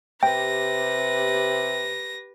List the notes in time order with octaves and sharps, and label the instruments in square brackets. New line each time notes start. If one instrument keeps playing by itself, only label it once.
[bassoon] C3 [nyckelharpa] G4 B4 [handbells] G5 [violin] A#6